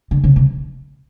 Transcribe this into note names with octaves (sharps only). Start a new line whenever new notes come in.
D3
C#3
C3